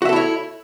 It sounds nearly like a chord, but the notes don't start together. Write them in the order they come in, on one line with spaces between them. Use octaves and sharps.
F#4 E5 A4 E4 C#5